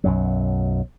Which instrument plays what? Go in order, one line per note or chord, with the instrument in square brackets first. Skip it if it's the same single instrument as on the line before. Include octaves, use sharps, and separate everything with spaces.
[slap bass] B1 F#2 F#3